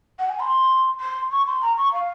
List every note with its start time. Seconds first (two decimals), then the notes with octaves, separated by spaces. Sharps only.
0.19 F#5
0.29 G#5
0.40 C6
1.00 C6
1.31 C#6
1.47 C6
1.62 A#5
1.77 C#6
1.93 F5